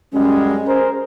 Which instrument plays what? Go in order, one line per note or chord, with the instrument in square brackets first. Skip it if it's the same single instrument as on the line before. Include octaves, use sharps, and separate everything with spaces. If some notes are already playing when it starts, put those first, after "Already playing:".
[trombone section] F#2 G3 G#3 [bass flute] C#4
[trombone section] G#4 A#4 C5